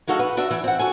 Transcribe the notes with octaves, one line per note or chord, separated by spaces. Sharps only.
G#3 D#4 F#4 A4 F5
B4
D4 F#4 E5
E3 D4
C4 F#5
F#4 A4 G#5